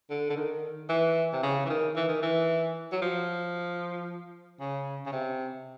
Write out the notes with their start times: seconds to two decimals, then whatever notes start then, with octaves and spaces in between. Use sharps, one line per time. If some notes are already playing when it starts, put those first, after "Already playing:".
0.10 D3
0.30 D3
0.36 D#3
0.89 E3
1.33 C3
1.43 C#3
1.65 E3
1.70 D#3
1.96 E3
2.09 D#3
2.23 E3
2.92 F#3
3.02 F3
4.60 C#3
5.06 C#3
5.12 C3